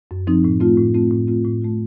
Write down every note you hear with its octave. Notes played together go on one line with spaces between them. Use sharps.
F#2
F3 C4 D#4
A2
A3 C4 F4
A2
A3 C4 F4
A2
A3 C4 F4
A2
A3 C4 F4